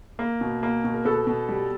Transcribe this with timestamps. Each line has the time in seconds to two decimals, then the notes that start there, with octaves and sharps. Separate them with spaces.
0.19 A#3
0.41 B2
0.63 A#3
0.84 B2
0.94 A#4
1.05 B2 A4 B4
1.27 B2
1.49 G3